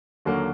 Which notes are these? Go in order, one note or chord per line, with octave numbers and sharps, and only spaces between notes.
D#2 D3 F#3 A#3